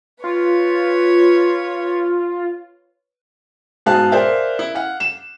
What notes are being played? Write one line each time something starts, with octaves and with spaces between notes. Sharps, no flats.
F4 B4 C#5
G#2 B2 G#4 F5 A5 F#6
G#4 A#4 C5 D5 E5 F5
E4
F5 F#5
E7